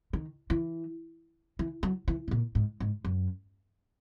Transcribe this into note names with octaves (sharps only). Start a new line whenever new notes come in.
D#3
E3
E3
F#3
E3
B2
A#2
G#2
G#2
F#2